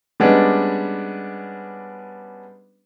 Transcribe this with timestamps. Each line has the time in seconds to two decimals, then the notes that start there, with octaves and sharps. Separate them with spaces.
0.20 G3 G#3 B3 C#4 D4